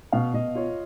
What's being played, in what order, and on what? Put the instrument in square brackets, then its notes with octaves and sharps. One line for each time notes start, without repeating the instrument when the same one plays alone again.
[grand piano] B2 [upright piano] F5
[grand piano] B2 [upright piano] D#5
[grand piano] F4 [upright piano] C#5